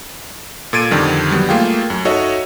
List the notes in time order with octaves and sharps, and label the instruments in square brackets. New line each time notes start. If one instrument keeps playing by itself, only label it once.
[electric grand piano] A#2 A4 G#6 A6 D7 D#7
F2 D3 D#3 G3
F#3 G3 B3
A3 A#3 F4 G#4 G5
F#2
D#4 F#4 A4 C#5 D#5 E5